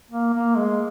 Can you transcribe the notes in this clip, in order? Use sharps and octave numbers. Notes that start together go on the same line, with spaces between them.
A#3
A#3
G#3